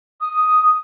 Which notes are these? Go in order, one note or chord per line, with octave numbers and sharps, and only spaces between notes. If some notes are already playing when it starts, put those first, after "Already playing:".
D#6